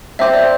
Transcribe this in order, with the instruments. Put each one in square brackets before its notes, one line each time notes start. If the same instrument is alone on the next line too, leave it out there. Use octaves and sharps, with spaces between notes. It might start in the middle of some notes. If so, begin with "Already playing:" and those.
[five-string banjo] C4 G4 C5 [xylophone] E5
[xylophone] D5